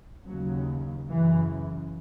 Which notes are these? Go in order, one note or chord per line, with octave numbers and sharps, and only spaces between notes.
D#2 C#3 F#3
F#2 C#3 E3